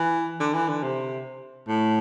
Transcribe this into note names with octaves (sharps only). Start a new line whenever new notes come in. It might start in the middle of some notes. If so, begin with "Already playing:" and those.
Already playing: E3
D3
E3
D3
C3
A2